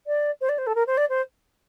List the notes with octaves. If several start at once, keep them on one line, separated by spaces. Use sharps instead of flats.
D5
C5
D5
C5
A4
A#4
C5
D5
C5